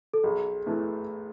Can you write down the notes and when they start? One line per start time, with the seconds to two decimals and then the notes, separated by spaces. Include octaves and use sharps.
0.14 A4
0.24 B1 G#4
0.66 A2 E3 A3